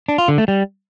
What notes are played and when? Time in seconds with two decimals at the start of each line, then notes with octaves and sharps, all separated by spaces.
0.09 D4
0.18 F4
0.28 D3
0.38 A3
0.48 G3